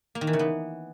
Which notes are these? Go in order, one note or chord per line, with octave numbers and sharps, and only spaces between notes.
A#3
D#3
E3
C#3
B3